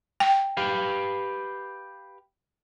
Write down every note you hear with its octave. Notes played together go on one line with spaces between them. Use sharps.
G5
G4 B4 F5